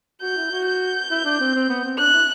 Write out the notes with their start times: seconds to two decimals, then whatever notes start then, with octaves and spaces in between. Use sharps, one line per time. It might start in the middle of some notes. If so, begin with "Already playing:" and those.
0.22 F#4 G6
0.37 E4
0.51 F#4
0.67 G6
1.10 E4
1.25 D4
1.40 C4
1.55 C4
1.69 B3
1.84 C4
1.98 D4 F#6
2.14 E4